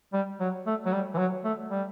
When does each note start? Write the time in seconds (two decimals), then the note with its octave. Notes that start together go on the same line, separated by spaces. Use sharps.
0.13 G3
0.40 F#3
0.66 A3
0.86 F#3
0.93 G3
1.14 E3
1.18 F#3
1.44 A3
1.71 G3